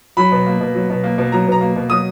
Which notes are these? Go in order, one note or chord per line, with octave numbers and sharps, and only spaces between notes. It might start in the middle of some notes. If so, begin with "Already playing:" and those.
F#3 B5
B2
A#3
B2
F#3
B2
A#3
B2
F#3 A#5
B2 A#5
A#3
B2
F#3 D#6